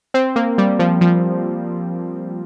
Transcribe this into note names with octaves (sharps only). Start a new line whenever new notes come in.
C4
A#3
G3
F3
F3